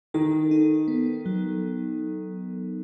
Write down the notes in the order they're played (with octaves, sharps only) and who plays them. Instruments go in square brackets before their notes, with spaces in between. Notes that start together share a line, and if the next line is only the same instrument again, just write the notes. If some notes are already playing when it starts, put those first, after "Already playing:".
[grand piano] D#3 [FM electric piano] A4
[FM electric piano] D#4
B3
F#3